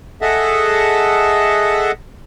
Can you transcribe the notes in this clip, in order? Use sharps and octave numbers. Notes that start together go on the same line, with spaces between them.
G#4 A4 D#5 E5 F#5 A5